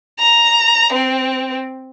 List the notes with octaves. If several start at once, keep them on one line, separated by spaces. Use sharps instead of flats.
A#5
C4